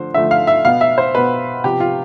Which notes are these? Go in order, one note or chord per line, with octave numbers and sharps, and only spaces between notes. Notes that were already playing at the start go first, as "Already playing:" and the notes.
Already playing: D3 F3 A3 C5
D3 F3 A3 E5
F5
E5
B2 B3 F5
E5
C5
B2 B3 B4
C3 F3 B3 G4
F4